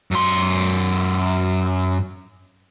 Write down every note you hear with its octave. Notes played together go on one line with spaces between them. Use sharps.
F#2 C6